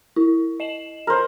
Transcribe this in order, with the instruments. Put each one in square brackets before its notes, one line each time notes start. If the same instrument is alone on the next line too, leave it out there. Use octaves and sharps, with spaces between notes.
[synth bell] E4
D#5 E7 F#7
[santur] A#4 C5